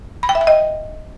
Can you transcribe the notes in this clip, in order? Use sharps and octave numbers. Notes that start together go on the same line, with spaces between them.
B5
G5
E5
G5
D#5